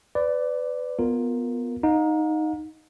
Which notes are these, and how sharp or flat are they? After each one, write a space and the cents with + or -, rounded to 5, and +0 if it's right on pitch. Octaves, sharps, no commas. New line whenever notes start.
B4 +25 D5 +0
B3 +0 F4 +10 A#4 -5
D#4 +0 F5 +45